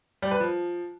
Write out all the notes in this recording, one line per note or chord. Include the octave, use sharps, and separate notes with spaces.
G3
B4
F3